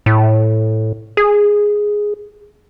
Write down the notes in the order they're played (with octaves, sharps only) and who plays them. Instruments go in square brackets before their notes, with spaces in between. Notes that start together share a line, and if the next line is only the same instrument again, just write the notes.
[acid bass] A2
G#4